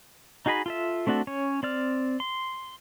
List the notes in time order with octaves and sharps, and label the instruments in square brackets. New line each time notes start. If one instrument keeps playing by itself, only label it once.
[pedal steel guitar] D#4 F#4 G#4 D#5 B5
F4 A4 E5
A3 C4 D4 F#4 A4
C#4 C#5
C4 D5 F6
C6